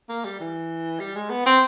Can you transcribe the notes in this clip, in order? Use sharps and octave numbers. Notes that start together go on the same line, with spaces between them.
A#3
G3
E3
G3
G#3
B3
C4